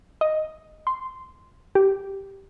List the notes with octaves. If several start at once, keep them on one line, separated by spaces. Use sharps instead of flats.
D#5
C6
G4